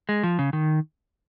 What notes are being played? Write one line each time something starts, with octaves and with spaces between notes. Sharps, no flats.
G#3
F3
C#3
D#3